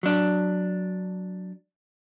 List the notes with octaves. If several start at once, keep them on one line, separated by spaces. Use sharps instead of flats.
F#3 D4